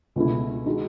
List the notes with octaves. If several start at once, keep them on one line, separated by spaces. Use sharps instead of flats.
C#2 B2 A3 E4
D#3 G#3 D#4 F#4